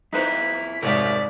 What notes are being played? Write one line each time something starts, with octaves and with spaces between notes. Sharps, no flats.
F2 D#4 E4 B4 C5 A#5 B6
C2 F2 G#2 A#4 C#5 D5 E5